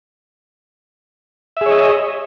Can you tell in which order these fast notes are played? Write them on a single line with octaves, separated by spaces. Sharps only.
E5 G#4 C#5 D#5